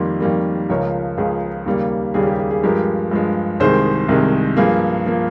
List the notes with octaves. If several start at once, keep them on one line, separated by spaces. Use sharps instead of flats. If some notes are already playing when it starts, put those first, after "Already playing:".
Already playing: F2 D#3 G3 A#3 C6
F2 D#3 G3 A#3
C#2 C#3 F3 A#4 C#5
C#2 C#3 F3 G#4
D#2 C#3 G3 A#3
D#2 C#3 G3 A#3 G#4
G4
G#4
G#4
G2 F3 G#3 G4 A#4
G2 F3 G#3
C2 C3 D#3 G#3 G#4 C5
C2 C3 D#3 G#3
G2 F3 A#3 G#4
F3 A#3